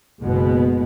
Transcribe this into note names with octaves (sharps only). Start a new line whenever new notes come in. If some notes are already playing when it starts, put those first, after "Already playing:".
F#1 B2 G#3 B3